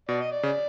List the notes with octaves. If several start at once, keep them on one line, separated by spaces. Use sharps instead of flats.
B2 D5
D#5
D5
C#3